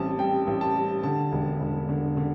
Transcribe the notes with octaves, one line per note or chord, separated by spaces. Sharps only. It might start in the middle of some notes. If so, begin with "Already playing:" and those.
Already playing: A1 G3 C4 A5
G3 G5
A1
A5
G3
D3 A5
E1
E1
D3
D3